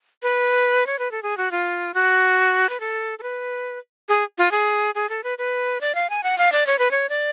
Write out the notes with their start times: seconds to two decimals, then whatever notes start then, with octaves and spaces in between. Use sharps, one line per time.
0.23 B4
0.87 C#5
0.99 B4
1.11 A4
1.23 G#4
1.37 F#4
1.51 F4
1.94 F#4
2.69 B4
2.80 A4
3.19 A4
3.23 B4
4.09 G#4
4.38 F4
4.51 G#4
4.95 G#4
5.09 A4
5.24 B4
5.38 B4
5.81 D5
5.95 F5
6.10 G#5
6.23 F#5
6.38 F5
6.52 D5
6.67 C#5
6.79 B4
6.91 C#5
7.09 D5